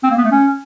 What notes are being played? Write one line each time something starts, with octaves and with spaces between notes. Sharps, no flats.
C4
A#3
B3
A3
C#4